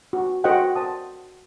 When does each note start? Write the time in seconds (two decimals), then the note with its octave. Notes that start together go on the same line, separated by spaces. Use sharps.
0.13 F#4
0.44 F#4 A#4 C5 D#5 F#5 G5
0.75 C5 A5 D#6